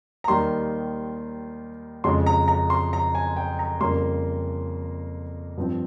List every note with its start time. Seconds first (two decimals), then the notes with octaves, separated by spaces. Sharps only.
0.24 A#5
0.28 D#2 D#3 G3 C6
2.04 F2 C#3 G#3 C6
2.26 A#5
2.48 A#5
2.70 C6
2.93 A#5
3.15 G#5
3.37 G5
3.59 A#5
3.80 F2 C#3 G3 A#3 C6
5.57 G2 F3 C4